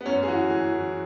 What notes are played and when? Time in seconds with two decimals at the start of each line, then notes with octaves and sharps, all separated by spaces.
0.01 B3
0.06 F#2 C#4
0.23 G#4
0.28 E3 F#4
0.50 F#2 G#4
0.72 E3